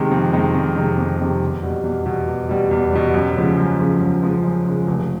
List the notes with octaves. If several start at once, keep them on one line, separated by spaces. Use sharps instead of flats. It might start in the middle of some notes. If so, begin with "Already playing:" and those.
Already playing: C3 D#3 G#3
F2
C3 D#3 G#3
F2
C3 D#3 G#3
F2
C3 D#3 G#3
E2
B2 G3
E2
B2 G3
E2
B2 G3
E2
B2 G3
F#2
C#3 F3 G#3
F#2
C#3 F3 G#3
F#2
C#3 F3 G#3
F#2
C#3 F3 G#3
F1